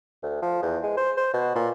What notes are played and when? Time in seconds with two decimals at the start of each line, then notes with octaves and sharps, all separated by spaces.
0.23 D2
0.42 F3
0.62 E2
0.83 G#3
0.97 C5
1.17 C5
1.34 B2
1.55 A#2